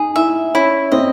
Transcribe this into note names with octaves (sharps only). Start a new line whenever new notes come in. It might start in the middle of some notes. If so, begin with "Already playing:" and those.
Already playing: D#4 G#4
E4 E5
C#4 E4
C4 D#5